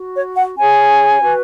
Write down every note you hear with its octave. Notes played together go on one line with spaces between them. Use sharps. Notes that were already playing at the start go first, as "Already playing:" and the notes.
Already playing: F#4
C#5
F#5
C#4 G#4 C#5 G#5
F#4 B4